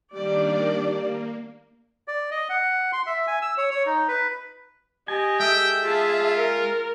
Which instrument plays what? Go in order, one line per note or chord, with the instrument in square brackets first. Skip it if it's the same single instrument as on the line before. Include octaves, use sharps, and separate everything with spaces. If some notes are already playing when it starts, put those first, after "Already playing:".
[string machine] D#3 A#3 D4 [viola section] G3 D5
[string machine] A#3
[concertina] D5
D#5
F#5
C6
E5
G#5
E6
C#5
C#5
D#4
B4
[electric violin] G4 [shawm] D#5 [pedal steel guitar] G#5
[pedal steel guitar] G#3 A4 D#5 [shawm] E5 [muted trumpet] G5
[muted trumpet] F4 [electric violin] G#4 A5
[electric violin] A#4